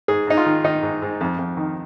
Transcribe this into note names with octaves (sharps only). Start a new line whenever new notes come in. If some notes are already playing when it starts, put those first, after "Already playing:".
G#2 G#4
G#2 D#4
F4
D#3
D#3 D#4
G#2
G#2
F2
F2
D#3